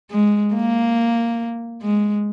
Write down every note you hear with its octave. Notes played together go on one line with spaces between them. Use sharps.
G#3
A#3
G#3